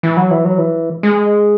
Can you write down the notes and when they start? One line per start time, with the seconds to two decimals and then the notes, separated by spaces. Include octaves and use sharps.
0.03 E3
0.17 F#3
0.31 E3
0.45 F#3
0.58 E3
1.03 G#3